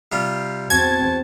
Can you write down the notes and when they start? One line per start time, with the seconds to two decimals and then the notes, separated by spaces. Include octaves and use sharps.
0.12 C3 G3 F4
0.70 E2 C4 F#4 A5 G#6